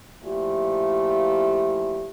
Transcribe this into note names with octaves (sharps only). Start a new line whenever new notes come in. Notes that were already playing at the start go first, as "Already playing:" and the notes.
A#2 F3 A3 E4 G4